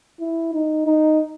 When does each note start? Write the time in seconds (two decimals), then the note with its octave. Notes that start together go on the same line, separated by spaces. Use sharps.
0.20 E4
0.54 D#4
0.87 D#4